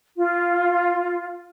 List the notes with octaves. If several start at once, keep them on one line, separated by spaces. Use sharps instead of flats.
F4